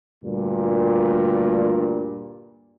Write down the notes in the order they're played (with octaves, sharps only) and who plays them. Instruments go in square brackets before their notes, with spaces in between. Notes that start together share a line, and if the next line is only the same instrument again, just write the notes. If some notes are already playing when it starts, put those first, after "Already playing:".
[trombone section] D2 G2 A#2